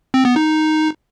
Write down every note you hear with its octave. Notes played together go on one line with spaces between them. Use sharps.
C4
B3
D#4